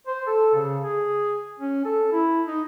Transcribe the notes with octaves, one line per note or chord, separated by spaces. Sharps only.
C5
A4
C#3
G#4
C#4
A4
E4
D#4